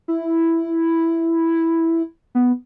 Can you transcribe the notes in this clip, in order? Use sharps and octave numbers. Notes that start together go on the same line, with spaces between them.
E4
B3